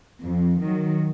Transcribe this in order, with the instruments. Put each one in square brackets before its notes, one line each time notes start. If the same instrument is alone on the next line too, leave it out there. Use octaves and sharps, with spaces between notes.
[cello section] F2
D#3 F#3